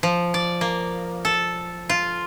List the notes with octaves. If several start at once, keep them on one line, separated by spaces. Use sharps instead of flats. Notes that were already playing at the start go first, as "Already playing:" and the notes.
F3
D5
A#3
A4
F4